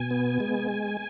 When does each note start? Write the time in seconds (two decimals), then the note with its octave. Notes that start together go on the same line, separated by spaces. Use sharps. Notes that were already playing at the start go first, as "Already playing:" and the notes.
Already playing: B2 G#5
0.11 B3
0.40 G#3